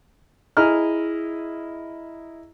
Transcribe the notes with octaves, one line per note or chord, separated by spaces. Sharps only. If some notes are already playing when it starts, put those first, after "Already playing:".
E4 G#4 D#5 A#5 F6